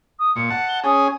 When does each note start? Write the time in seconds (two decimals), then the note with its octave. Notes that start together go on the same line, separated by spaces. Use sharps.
0.19 D#6
0.36 A#2 C#7
0.50 F#5 A5
0.68 G7
0.84 C#4 G#4 D#6